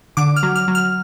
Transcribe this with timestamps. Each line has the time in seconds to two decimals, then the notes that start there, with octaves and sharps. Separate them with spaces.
0.17 D3 D6
0.36 F6
0.43 F#3
0.56 F6
0.68 F#3
0.75 F6